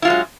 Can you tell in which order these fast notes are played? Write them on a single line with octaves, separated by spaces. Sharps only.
E4 F4 G#3 F#3